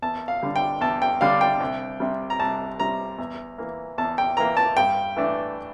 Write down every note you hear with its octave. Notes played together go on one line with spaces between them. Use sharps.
E2 A5
F5
D3 G3 D4
G5
E2 A5
G5
D3 G3 D4 F5
G5
C2
C3 G3
A#5
C2 A5
C3 G3 A#5
E2
E3 A#3
E2 A5
G5
E3 A#3 A#5
A5
G2 G5
E3 A3 D4